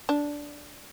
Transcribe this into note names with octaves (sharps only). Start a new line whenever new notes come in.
D4